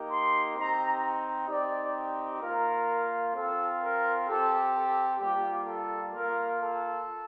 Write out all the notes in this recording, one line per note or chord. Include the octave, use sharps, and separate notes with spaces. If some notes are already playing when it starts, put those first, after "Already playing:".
Already playing: A#3 D#4 G4
C6
C4 D#4 G4 A#5
C4 D#4 G4 D5
A#3 F4 A#4
C4 F4 A4
A#4
C4 G4 A4
A4
G3 A#3 F4 G4
A4
A#3 F4 A#4
A4